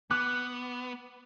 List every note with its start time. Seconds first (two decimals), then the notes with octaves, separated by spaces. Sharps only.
0.11 B3 D6 F#6